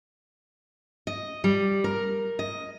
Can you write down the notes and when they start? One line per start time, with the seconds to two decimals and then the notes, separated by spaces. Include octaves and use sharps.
1.07 D#5
1.44 G3
1.84 A#4
2.39 D#5